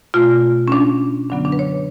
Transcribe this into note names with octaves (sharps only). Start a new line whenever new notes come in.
B2 A3 F4
C#4
D4
F#2 D3 F#3 B3 D4
D4
B4
C#5